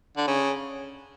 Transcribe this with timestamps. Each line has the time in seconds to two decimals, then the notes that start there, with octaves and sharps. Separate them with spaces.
0.17 D3
0.27 C#3